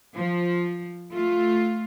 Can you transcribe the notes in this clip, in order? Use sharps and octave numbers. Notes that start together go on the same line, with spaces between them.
F3
A3 F4